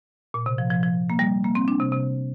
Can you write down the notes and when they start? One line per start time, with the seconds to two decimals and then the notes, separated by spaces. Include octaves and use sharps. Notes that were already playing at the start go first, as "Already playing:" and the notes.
0.34 A#2
0.46 C3
0.58 F3
0.70 F3
0.83 F3
1.10 A#3
1.19 G3
1.44 A#3
1.55 C4
1.68 D4
1.80 C3
1.92 C3